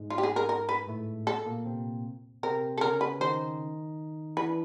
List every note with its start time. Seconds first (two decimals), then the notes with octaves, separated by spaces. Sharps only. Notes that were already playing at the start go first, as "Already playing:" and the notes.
Already playing: G#2 G#3
0.10 F4
0.18 G4
0.23 G#4
0.36 A#4
0.49 A#4
0.69 B4
0.87 A2 A3
1.27 A4
1.46 A#2 A#3
1.66 C3 C4
2.43 C3 C4 A#4
2.78 A4
2.81 C#3 C#4 A#4
3.01 B4
3.20 D#3 D#4 C5
4.37 E3 E4 B4
4.48 D4